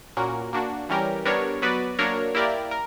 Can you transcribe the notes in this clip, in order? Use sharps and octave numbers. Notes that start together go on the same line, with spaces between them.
A#2 A#3 C#4 F#4 A#4
A#3 D4 F#4
E3 G3 C#4 G4 A#4
G3 B3 D4 A#4 C#5
F#3 B3 F#4 B4 D5
F#3 A#3 D4 A#4 C#5
A#3 E4 G4 A#4 D5
A#4